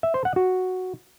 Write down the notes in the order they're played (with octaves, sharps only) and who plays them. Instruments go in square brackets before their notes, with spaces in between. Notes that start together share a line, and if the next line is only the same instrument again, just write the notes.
[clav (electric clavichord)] E5
C5
F#5
F#4